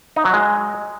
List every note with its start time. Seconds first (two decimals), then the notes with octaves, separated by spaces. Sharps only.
0.16 D#4
0.25 F#3
0.33 G#3